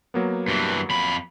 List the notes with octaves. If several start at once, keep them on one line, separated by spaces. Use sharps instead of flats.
F#3 A#3 B3
G2 E3
F2 B5